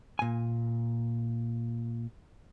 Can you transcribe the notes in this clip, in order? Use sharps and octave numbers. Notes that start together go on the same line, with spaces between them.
A#2 G#5